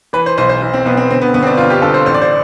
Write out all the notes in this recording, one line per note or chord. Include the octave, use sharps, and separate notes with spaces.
E3 B4
C5
B1 C5
C5
B1
C4
B1 B3
C4
D3 C4
B3
G1 B3
C4
D4
G1 F4
G4
G1 A4
C5
A1 C5
D5
C5